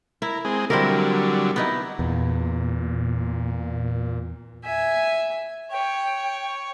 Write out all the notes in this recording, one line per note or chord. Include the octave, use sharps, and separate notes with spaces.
E4 A#4
G#3 C4 G#4
D3 F#3 G3 C4 E4 A#4
B3 D#4 E4
E2 A#2
E5 G#5
C#5 G5